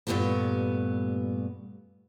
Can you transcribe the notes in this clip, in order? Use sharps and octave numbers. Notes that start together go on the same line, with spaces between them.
G2 A#2 A3 B3 G4 A5